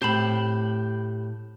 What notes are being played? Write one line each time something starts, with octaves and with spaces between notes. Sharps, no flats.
A2 C4 G4 A5 B5